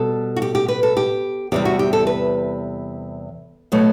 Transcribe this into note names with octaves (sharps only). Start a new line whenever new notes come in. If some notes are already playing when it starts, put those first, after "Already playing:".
Already playing: B2 G3 A4
F#4
G4
G4
B4
A4
G4
E2 C3 G3 G4
F#4
G4
A4
B4
B2 F#3 A3